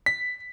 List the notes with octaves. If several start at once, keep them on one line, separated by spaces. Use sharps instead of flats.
B6